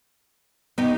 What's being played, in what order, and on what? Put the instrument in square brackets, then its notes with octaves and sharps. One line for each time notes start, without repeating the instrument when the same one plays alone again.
[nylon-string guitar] B3 [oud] D#4 G4